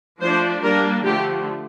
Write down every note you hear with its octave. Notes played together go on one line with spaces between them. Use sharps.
F3 A3 D4 C5
G3 A#3 D4 A#4
D3 F3 A3 G4